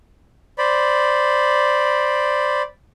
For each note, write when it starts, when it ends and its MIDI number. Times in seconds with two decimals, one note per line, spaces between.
0.58 2.62 72
0.58 2.62 74
0.58 2.62 83